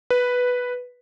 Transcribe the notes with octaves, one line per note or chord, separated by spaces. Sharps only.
B4